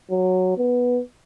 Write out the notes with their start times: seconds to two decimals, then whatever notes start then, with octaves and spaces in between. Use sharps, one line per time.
0.11 F#3
0.58 B3